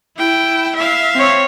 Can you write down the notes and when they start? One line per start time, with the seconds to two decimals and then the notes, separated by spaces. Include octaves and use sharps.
0.19 E4 G5
0.76 E5 F5
1.15 C4 C#5